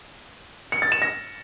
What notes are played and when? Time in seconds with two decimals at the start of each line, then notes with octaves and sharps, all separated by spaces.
0.72 C#7
0.82 A6
0.92 E7
1.02 A#6